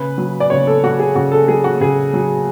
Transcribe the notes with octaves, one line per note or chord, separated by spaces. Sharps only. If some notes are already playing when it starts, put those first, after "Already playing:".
Already playing: C#3 B4
F#3
D5
C#3 C#5
A4
F#3 F#4
G#4
C#3 F#4
A4
F#3 G#4
F#4
C#3 G#4
F#3